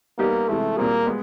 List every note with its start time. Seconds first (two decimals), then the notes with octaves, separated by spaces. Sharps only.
0.18 G3 A#3 B3 D#4 G4
0.48 C3 E3 G#3 A3
0.76 A#2 G3 A#3 C4 F4 G#4
1.07 G#3 B3